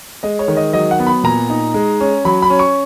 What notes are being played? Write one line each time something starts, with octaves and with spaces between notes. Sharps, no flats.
G#3 D#5
C#5
D#3
D#5
F#3 D#5
F#5
B3
B5
A#2 A#5
D#4
G#3
C#4
F#3 B5
B5
C#4
C#6